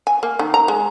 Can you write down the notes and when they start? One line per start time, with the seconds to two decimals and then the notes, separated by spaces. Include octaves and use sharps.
0.07 G#5
0.23 A#3
0.39 D#3
0.54 A#5
0.68 G#3